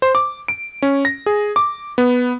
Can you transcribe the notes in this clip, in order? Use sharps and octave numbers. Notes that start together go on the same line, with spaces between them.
C5
D6
D7
C#4
A#6
G#4
D6
B3